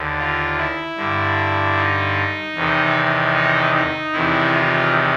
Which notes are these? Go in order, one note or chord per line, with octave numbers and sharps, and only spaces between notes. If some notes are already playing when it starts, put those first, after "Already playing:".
Already playing: D#2 D3
F4
E4
G2 D3
D#4
E2 C3 D#3
D#4
D#4
E2 C3 D#3 E4
F4